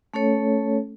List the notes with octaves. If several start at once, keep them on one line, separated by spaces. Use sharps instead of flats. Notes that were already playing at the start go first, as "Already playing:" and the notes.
A3 C#4 A4 C#5